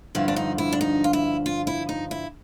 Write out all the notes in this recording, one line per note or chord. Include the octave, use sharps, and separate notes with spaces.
G2 D3 F3 E4
D4
D#4
E4
D4
D#4
F4
E4
F4
E4
D#4
E4